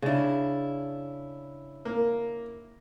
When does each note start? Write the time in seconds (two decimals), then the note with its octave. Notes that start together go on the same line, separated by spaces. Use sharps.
0.02 C#3 D4 E4
1.85 A#3